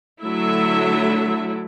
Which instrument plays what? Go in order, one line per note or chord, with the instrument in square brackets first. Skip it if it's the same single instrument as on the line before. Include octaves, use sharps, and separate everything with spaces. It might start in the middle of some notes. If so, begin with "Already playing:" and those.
[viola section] D3 F#3 A3 E4 E5